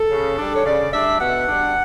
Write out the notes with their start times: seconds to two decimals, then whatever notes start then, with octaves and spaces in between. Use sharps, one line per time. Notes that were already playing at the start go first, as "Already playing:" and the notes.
Already playing: A4
0.11 C#3
0.38 G3 D4
0.55 C#5
0.65 C#3 D5
0.93 G3 D4 E5
1.21 B2 F#5
1.47 G3 D4